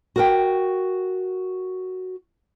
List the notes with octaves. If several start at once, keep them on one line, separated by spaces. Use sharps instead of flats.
F#4 A#4 G5